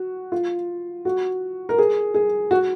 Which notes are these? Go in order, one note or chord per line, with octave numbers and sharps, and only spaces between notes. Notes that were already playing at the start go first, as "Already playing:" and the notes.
Already playing: F#4
F4
F#4
A#4
G#4
G#4
F#4